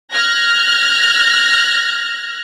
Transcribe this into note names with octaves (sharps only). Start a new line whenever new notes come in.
F6 F#6 G#6 A#6